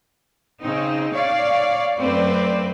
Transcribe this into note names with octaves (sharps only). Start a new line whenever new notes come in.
C#3 C4 D#4
C#5 D5 F5
F#2 A3 C4 B4 D5